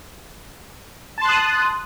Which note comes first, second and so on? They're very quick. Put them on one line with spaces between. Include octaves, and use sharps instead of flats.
A5 C6 F#6 D#6